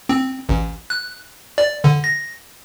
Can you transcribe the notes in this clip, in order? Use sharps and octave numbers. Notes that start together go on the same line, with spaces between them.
C4
A1
F#6
D5
D3
A#6